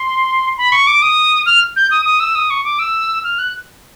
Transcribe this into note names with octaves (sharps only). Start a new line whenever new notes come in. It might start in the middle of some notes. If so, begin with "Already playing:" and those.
Already playing: C6
B5
C#6
D6
D#6
F6
G6
D#6
D#6
E6
D#6
C#6
D6
E6
F6
F#6